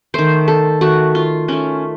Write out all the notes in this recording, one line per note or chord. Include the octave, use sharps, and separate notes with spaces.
D#3 A3 C5
A4
D#3 A3 F#4
F4
D#3 A3 C#4